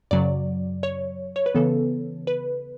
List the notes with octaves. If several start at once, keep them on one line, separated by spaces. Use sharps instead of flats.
F#2 C#3 F#3 D5
C#5
C#5
B4
C#3 E3 B3 A4
B4